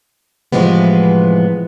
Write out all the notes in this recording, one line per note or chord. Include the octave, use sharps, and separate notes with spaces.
A2 C3 E3 F3 G#3 B3